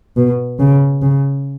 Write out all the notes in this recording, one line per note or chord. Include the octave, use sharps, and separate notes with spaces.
B2
C#3
C#3